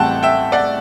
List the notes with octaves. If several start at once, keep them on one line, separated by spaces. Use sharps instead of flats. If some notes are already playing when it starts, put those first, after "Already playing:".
Already playing: A1 A2 G3 C4 F#5 G5 A5
E5 G5
D5 F#5